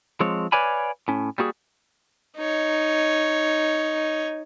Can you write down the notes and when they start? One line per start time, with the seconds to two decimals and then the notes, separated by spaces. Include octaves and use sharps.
0.20 F3 G#3 C4 C#5
0.52 B4 C#5 D5 F5 G#5 B5
1.08 A2 C#4
1.38 G3 A#3 F#4 G#4
2.37 D#4 C#5